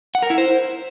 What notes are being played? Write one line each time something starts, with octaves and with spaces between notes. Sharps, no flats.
F#5
A#4
E4
C5